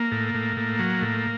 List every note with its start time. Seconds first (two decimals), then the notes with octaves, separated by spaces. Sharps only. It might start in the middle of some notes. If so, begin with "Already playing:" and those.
Already playing: A#3
0.12 A2
0.34 A2
0.57 A2
0.79 F#3
1.01 A2